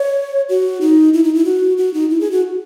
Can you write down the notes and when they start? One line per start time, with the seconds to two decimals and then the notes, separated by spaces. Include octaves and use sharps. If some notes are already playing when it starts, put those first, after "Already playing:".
Already playing: C#5
0.49 F#4
0.81 D#4
1.13 E4
1.24 D#4
1.35 E4
1.45 F#4
1.78 F#4
1.94 D#4
2.10 E4
2.21 G#4
2.32 F#4